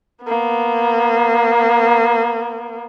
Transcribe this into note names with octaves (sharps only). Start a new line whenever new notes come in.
A#3 B3